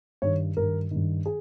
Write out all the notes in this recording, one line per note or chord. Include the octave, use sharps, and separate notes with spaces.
G2 D#3 C#5
G2 D#3 A#4
G2 D#3
G#4